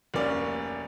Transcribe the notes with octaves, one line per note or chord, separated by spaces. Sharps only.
F1 D2 A#3 C#4 D5